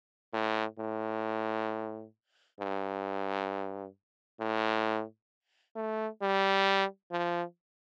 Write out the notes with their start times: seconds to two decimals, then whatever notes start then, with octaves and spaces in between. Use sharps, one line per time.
0.34 A2
0.79 A2
2.60 G2
4.40 A2
5.76 A3
6.22 G3
7.11 F3